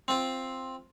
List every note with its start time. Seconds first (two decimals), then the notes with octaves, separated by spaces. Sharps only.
0.08 C4 F4